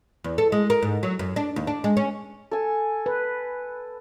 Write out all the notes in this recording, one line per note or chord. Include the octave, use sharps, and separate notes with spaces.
E2
A4
G#3
A#4
G#2
F#3
F#2
D4
D#2
D4
G#3
C#4
A4 G#5
B4